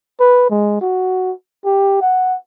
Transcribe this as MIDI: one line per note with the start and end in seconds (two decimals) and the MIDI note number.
0.20 0.47 71
0.50 0.81 56
0.81 1.32 66
1.65 2.01 67
2.02 2.36 78